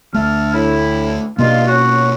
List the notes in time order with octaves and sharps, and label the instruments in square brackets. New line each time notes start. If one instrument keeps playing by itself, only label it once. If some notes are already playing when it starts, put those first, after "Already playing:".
[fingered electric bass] D2 A3 [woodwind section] E5 A5 F6
[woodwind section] A2 E4
[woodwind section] G2 D#4 F4 [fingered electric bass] B2 A#3
[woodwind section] F#3 C#4 F#4